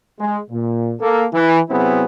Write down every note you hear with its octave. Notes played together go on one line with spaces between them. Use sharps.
G#3
A#2
A#3 A4
E3
C3 F#3 B3 C4 E4 G#4